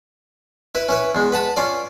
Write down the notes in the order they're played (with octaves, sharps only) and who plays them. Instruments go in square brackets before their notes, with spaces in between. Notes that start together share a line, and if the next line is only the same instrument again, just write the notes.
[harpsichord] E4 B4
C#4 E4 B4
E2 G#3
B4 F#5 A5 B5
C#4 F4 D5